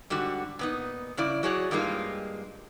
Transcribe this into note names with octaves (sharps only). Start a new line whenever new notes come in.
G#2 D3 G3 F#4
A#2 B3 D#4
G2 C#3 E4 D5
F#3 F#4 G#4 C#5 D5
G2 G3 G#3 A#3 D#4 F4